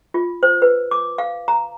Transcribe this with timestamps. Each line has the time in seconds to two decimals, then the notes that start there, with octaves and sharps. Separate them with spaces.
0.14 F4
0.43 C5
0.62 B4
0.91 D6
1.18 F5
1.48 A#5